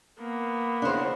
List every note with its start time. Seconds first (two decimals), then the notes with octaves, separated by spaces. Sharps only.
0.19 A#3 B3
0.82 E2 C#3 D4 C5